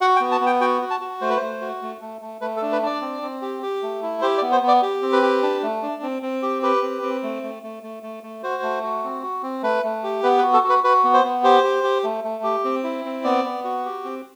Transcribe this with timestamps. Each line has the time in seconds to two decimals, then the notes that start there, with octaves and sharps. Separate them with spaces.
0.01 F#4 F#5
0.16 G5
0.21 B3
0.32 A5
0.41 B3
0.46 G5
0.61 F#4 G5
0.82 F#4
0.91 A5
1.01 F#4
1.21 A3 C5
1.30 B4
1.37 A3 C5
1.61 F#4
1.82 A3
2.01 A3
2.21 A3
2.41 A3 B4
2.56 A4
2.62 D4
2.72 B4
2.82 D4 D5
3.02 C4
3.22 C4
3.42 G4
3.62 G4
3.83 A3
4.03 E4
4.22 G4 C5
4.38 D5
4.42 B3
4.52 C5
4.63 B3
4.68 D5
4.82 G4
5.02 C4
5.12 B4
5.22 G4
5.42 D4
5.63 A3
5.83 D4
6.02 C4
6.22 C4
6.43 G4
6.62 G4 B4
6.82 C4
7.03 C4
7.23 A3
7.43 A3
7.63 A3
7.83 A3
8.03 A3
8.23 A3
8.43 F#4 C5
8.63 A3
8.83 F#4
9.04 C4
9.23 F#4
9.43 C4
9.63 A3 B4
9.84 A3
10.04 G4
10.23 B3 B4
10.38 B4
10.43 F#4
10.53 A4
10.64 F#4
10.69 B4
10.84 F#4 B4
11.04 B3
11.14 C5
11.24 B3
11.44 G4 C5
11.64 G4
11.83 G4
12.04 A3
12.24 A3
12.44 G4
12.64 C4
12.84 E4
13.05 C4
13.24 B3 D5
13.44 B3
13.64 F#4
13.85 G4
14.05 C4